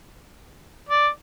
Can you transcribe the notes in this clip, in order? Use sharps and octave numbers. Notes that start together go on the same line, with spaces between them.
D5